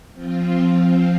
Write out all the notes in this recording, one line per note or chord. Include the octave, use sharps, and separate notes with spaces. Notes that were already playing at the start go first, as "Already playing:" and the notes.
F3 C4 F4